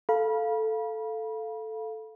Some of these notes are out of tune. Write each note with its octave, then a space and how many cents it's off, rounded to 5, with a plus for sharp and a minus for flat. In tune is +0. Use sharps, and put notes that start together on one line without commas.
A4 +0 F5 +0 B5 -35